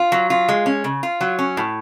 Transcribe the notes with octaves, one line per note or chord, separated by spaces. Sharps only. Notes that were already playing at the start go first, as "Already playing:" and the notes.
Already playing: F4
F#3
F4
G#3
C#4
C#3
F4
F#3
C#4
A2